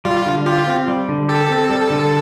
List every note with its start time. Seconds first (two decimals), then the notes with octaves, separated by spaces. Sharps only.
0.05 G3 F4
0.26 D3
0.47 F4 G4
0.67 C4
0.88 G3
1.08 D3
1.29 G4 A4
1.50 C4
1.69 G3
1.90 D3